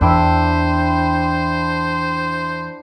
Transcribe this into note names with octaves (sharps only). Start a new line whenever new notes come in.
E2 D4 E4 C5 G5